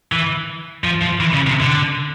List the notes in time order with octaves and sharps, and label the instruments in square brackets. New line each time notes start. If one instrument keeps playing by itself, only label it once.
[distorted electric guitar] E3
F3
F3
E3
C#3
C3
D3